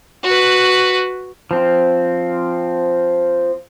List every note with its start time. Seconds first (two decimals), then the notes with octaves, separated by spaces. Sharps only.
0.24 F#4 B4
1.51 F3 C4